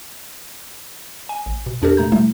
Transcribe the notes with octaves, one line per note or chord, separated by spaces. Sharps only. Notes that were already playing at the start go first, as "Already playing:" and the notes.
G#5
A1
B2
E2 D4 G4 A4 A#4
B2 A3 A#5 G6
B2 G3 A3 E4